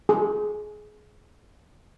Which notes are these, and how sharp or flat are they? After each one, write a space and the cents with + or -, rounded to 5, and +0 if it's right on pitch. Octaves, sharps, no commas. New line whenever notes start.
G#4 +25